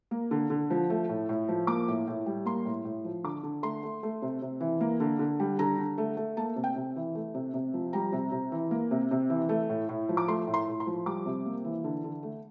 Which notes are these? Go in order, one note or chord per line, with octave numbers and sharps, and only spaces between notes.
A#3
D3
D3
F3
A3
A2
A2
F3
A#3 D6
A2
A2
G3
A#3 C6
A2
A2
F3
D3 D6
D3
A3 C6
A3
A3
C3
C3
E3
A#3
D3
D3
G3
D3 A#5
D3
A3
A3
A#3 A5
C3
G5
C3
E3
A3
C3
C3
F3
G3 A#5
C3
C3
E3
A#3
C3
C3
E3
A3
A2
A2
F3
D6
A3 C6
A2
C6
A2
C6
F3
G3 D6
C3
A#3
E3
D3
D3
A3